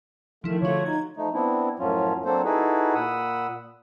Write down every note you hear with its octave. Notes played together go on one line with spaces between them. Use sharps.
D#3 F3 A3 E4
D3 A3 F4 F#4 C#5
D#4 G#6
F3 A3 D#4
B3 C4 D4 E4
F#2 A2 F3 F#3 C#4 F4
F#3 A#3 C4 D4 A4 C5
D#4 E4 F#4 G#4 A4 B4
A#2 F#5 B5 D#6 E6